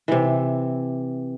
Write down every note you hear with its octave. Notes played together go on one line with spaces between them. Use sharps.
C3 E3